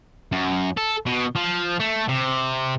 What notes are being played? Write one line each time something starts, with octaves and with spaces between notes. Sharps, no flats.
F#2
A4
B2
F3
A3
C3